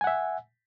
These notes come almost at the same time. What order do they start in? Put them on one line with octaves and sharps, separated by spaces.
G#5 F#5 E5